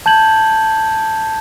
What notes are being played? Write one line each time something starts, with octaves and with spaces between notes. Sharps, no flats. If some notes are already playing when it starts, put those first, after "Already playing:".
A5 G6 G#6 F#7